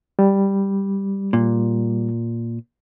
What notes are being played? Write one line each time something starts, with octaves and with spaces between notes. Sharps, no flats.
G3
A#2